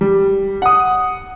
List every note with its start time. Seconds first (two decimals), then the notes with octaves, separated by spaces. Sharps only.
0.01 G3
0.62 F#5 D#6